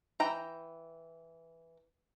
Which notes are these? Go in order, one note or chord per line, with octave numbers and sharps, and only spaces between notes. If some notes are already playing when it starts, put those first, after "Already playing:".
E3 G5 A#5